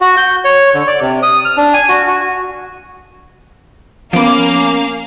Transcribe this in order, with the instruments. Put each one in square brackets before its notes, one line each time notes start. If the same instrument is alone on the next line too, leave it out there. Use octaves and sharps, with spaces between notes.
[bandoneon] F#4
G6
C#5
D3
D5
C3
D#6
F6
D4
G#5
F#4
F#4
[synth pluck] F3 B3 [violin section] A#3 F5 [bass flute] C#4 [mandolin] D6